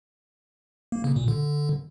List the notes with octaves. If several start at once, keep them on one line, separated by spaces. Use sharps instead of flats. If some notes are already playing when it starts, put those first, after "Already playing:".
A#3
C#3
A#2
D3